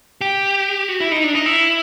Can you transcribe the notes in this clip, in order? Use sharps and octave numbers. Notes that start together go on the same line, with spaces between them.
G4
F#4
E4
D#4
D4
D#4
E4